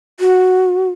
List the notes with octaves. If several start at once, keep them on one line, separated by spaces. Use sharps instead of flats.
F#4